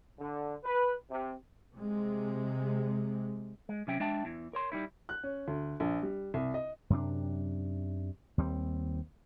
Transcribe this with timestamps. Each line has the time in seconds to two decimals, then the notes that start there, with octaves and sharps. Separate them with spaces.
0.19 D3
0.64 B4
1.10 C3
1.75 C3 G#3
3.69 G#3
3.87 C3 F#3 C#4 E5 G5
4.00 G#3 D4 E5 G5 A5
4.25 E2 E3
4.53 A#4 C#5 C6
4.72 G3 D#4 E4
5.09 F#6
5.23 C#4
5.48 D2
5.80 A#1
6.03 G3
6.34 C2
6.54 D#5
6.90 F#2 C3 D4
8.38 D#2 G3 C4